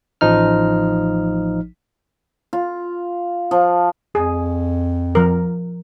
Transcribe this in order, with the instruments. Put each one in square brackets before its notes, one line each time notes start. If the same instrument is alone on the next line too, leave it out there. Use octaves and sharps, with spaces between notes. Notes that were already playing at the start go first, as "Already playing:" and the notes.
[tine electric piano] A1 F3 D#4 F6
[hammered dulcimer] F4
F3
[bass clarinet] F2 [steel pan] G#4
[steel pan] F3 A#4